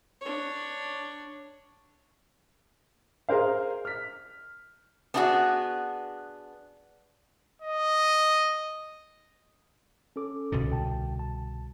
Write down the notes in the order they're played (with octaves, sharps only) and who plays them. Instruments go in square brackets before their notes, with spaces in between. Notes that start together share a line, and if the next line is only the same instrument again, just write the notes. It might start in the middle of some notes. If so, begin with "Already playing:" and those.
[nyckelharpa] D4 C#5
[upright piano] G#4 A#4 C5 F5
F6 B6
[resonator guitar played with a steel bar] B3 D4 D#4 F4 F#4 G#4
[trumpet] D#5
[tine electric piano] C#4 A4 D6
[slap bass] C2 B2 D3
[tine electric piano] D#2 G5 A5
A5